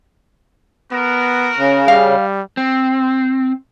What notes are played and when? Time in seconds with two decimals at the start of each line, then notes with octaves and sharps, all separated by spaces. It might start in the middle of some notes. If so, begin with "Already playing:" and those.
0.92 B3 F#4 A#4
1.57 C#3
1.88 G3 F5
2.57 C4